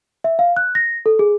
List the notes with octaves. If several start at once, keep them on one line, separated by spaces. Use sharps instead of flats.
E5
F5
F#6
A#6
A4
G#4